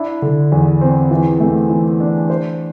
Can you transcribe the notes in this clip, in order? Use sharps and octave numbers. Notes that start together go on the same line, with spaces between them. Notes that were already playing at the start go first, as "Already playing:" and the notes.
Already playing: D4 E4
D3
E2
C4
E3
A3
E3
D4
C5